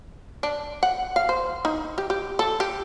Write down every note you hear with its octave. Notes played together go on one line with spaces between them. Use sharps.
D4
F#5
F5
C5
D#4
G4
G4
A4
G4